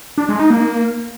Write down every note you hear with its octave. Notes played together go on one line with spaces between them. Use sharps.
D4
G#3
D#4
A#3